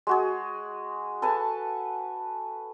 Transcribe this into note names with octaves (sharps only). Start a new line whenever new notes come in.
G#3 F#4 G#4
A4 B4 G#5 A5